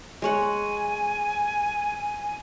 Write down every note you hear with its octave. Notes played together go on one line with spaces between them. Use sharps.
G#3 C#5 F#5 G#5